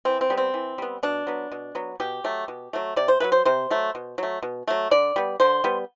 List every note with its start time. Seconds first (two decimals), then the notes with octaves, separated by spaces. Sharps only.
0.05 E3 C4
0.21 C4
0.30 G3 B3
0.37 C4
0.54 E3
0.78 G3 B3
1.03 B2 D4
1.27 F#3 B3
1.52 B2
1.75 F#3 B3
2.00 B2 G4
2.24 F#3 A3
2.48 B2
2.73 F#3 A3
2.96 C3 D5
3.08 C5
3.20 F#3 A3 B4
3.32 C5
3.45 C3 C5
3.70 F#3 A3
3.95 B2
4.18 F#3 A3
4.43 B2
4.67 F#3 A3
4.91 D3 D5
5.16 G3 B3
5.40 D3 C5
5.64 G3 B3